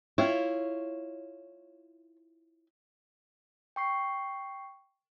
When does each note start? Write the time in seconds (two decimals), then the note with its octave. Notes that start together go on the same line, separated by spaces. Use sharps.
0.18 E4 F4 C#5
3.76 G5 C#6 C7